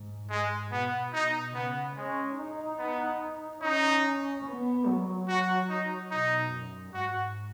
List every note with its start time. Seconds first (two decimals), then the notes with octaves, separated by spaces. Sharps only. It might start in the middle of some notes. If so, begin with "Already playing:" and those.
Already playing: G#2
0.30 G#2 G#3
0.72 B2 B3
1.12 B2 D#4
1.54 C#3 B3
1.96 G#3 C#4
2.38 D#4
2.79 B3
3.62 C#4 D#4
4.46 B3
4.86 F#3
5.28 F#4
5.69 D#4
6.11 B2 D#4
6.53 F#2
6.93 G#2 F#4